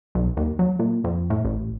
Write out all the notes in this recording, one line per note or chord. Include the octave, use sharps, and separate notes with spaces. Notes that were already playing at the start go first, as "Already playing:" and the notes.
B1
D#2
F#3
A#2
F2
A2
A1